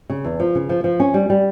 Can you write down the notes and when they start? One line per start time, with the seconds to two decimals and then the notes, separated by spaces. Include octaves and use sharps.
0.10 C#3
0.24 E2
0.40 F3
0.55 C#3
0.69 F3
0.84 F3
1.00 C#4
1.14 G3
1.30 G3